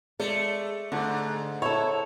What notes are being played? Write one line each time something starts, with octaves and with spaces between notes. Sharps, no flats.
G#3 A3 D5
G#2 D3 A3 D4
E4 A4 C#5